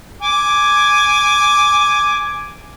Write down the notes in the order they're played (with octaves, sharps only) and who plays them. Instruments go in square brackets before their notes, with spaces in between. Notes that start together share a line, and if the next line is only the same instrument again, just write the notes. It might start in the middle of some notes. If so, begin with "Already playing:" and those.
[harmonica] G#5 D6